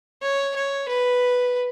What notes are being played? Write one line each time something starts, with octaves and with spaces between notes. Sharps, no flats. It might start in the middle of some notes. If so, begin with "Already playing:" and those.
C#5
C#5
B4